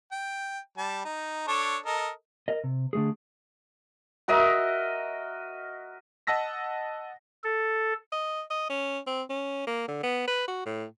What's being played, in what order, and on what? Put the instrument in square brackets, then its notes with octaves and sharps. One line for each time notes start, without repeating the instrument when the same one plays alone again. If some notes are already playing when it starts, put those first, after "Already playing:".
[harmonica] G5
G3 A5
D#4
D4 A4 C#5
A4 A#4 D#5
[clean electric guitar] A#4 D#5
C3
D3 A3 G#4
[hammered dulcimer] F#4 A#4 D#5 E5
[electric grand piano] D#5 F#5 A5 E6 A#6 B6
[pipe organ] A4
[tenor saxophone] D#5
D#5
C#4
C4
C#4
A#3
D3
B3
B4
F#4
A2